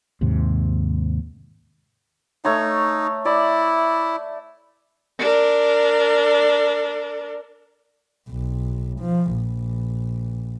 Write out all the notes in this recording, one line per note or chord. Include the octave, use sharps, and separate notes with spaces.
D#2 G#2 C3
A3 D#4 C#5 C#6
E4 D5
D4 A#4
B1
F3
A#1